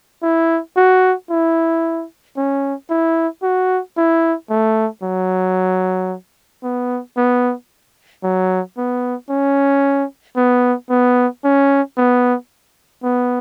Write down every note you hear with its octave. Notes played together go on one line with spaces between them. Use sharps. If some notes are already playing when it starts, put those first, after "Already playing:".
E4
F#4
E4
C#4
E4
F#4
E4
A3
F#3
B3
B3
F#3
B3
C#4
B3
B3
C#4
B3
B3